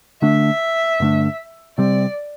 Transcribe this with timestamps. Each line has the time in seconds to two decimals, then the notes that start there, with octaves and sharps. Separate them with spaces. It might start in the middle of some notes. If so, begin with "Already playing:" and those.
0.22 D3 A3 D4 E5
1.00 G2 D3 A3 D4
1.78 C3 G3 C4 D5